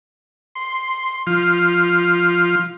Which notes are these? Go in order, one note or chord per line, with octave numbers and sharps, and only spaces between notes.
C6
F3 F4